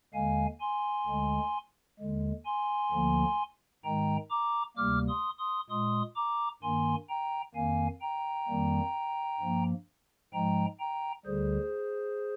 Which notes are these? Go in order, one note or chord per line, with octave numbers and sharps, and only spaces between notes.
D#2 D3 G#3 F5 G#5
G#5 C6
D2 D3 G#3
D#2 D3 G#3
G#5 C6
D2 D3 F3 A#3
G#2 D#3 G#3 G5 A#5
A#5 D6
D2 C3 G3 A#3 D6 F6
C6 D#6
C6 D#6
A#2 G#3 C6 D#6
A#5 D6
G2 D#3 A#3 G#5 C6
G5 A#5
F2 D#3 A#3 F5 G#5
G5 A#5
F2 D#3 G3 A#3
G2 F3 A#3
G#2 F3 G#3 G5 A#5
G5 A#5
D2 D3 G3 G#4 C5